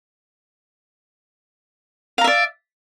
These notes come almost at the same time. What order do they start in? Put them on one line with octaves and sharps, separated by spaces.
F5 A#5 E5 D5